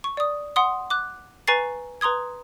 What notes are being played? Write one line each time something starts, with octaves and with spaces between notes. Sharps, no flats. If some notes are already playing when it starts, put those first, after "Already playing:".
C#6
D5 D#6
F#5 C6 D#6
D6 F#6
B4 G#5 A#5 C#6 A6 C7
B4 A#5 C6 D#6 G#6